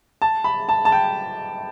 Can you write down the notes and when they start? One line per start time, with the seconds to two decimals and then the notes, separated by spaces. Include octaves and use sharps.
0.22 A5
0.44 B5
0.69 A5
0.85 A5
0.92 G5